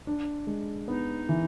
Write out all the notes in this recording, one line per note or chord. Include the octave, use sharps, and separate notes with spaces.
D4
G#3
B3 D#4
E3